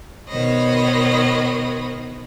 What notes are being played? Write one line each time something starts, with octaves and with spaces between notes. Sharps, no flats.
B2 D#3 C5 C#5 D#5 B5